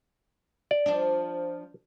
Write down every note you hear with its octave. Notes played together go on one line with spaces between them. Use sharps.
D5
F3 D4